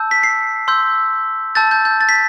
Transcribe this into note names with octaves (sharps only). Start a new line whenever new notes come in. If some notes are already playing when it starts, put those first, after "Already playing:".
Already playing: A5 E6 G6
B6
C7
C6 E6 G6
A5 E6 G6 A6
G6
G6
A6
B6